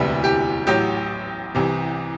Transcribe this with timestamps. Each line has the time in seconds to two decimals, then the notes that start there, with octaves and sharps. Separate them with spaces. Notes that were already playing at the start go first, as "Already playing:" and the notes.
Already playing: E1 D2 C3 G3 B3 E4
0.24 G4
0.67 A1 A2 F#3 G4
1.55 C2 C3 E3